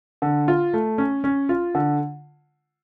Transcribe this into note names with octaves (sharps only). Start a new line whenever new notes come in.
D3
F4
A3
C#4
C#4
F4
D3